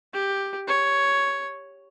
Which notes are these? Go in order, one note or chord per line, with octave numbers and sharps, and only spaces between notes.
G4
C#5